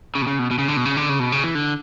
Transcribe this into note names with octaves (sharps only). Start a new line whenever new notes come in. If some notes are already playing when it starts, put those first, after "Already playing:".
C#3
B2
C#3
B2
B2
C#3
D3
B2
C#3
D3
C#3
B2
C#3
E3
D3